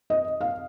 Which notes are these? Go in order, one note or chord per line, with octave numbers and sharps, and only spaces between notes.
D#5
F5